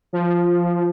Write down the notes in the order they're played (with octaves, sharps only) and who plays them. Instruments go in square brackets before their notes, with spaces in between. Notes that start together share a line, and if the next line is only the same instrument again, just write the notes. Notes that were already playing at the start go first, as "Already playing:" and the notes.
[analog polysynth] F3